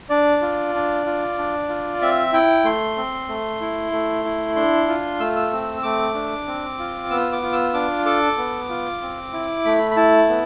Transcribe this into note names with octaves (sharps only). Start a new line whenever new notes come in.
D4 D5
F4
D4
F4
D4
F4
C4 E5
E4 G5
A3 C6
C4
A3
E4
A3
E4
D4 C6
F4
A3 E6
E6
C4
A3 D6
D4
C4
F4
B3 E6
D6
F4
E6
D4 D6
A4 D6
B3
F4
C4
E4
A3 B5
B5
E4 A5
B3